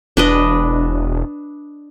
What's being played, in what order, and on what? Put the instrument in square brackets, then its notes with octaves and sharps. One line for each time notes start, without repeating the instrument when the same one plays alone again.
[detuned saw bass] E1 [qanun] D4 B4 D#5